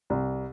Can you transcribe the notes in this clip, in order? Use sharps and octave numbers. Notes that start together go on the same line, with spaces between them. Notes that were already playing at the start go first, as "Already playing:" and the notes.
C2